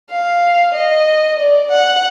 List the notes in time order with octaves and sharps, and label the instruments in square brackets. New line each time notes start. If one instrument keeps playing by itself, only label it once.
[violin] F5
D#5
D5
F#5